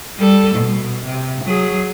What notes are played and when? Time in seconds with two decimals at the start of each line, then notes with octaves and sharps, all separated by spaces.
0.18 G3 A4
0.55 B2
1.05 C3
1.44 F#3 G#4